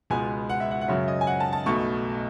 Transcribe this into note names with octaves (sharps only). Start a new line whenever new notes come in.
C#2 B2 G#3 B3 G#5
F#5
E5
F#5
F#5
F#2 C#3 F#3 E5
D#5
G#5
F#5
A5
A5
B1 B2 A3 C#6